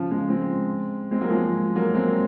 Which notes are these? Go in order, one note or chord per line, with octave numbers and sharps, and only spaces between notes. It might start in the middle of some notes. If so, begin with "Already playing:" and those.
Already playing: C#3 F3
F3 G#3
G#3 C4
G#3 C4
F#3 A#3
F3 G#3
F#3 A#3
G#3 C4